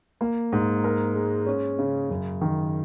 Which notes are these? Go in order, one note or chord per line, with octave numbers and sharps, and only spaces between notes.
A#3
G#2
A#4
G#3
C#4
C#3
F#2
D#3